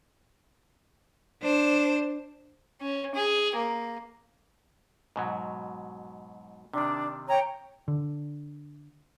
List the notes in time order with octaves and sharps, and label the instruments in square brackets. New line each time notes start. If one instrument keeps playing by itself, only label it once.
[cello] D4 C5
[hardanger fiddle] C#4
G#4
A#3
[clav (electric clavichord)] G#2 B2 F#3
[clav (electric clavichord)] C3 D#3 [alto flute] D4
[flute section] C#5 G5 [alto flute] A#5
[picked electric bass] D3